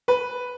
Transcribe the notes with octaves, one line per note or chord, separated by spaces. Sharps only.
B4